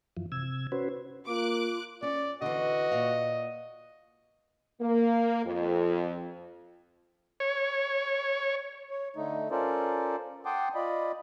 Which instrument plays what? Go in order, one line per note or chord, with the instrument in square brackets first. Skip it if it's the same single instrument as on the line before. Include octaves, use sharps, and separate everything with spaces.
[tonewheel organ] F#2 E3 F3
C3 E6 G#6
C#4 F#4 B4 C5
[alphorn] A#3 [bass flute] F4 [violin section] D6 F#6
[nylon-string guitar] C#4 [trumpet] D5
[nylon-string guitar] D3 E3 [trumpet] F#4 [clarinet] D#5
[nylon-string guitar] A#2 F5
[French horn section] A#3
F2
[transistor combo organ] C#5
[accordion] C#5
D3 A3 D#4
C#4 F4 A4 A#4 C5 D5
F#5 G5 A5 C6 D6 D#6
F4 D5 D#5 B5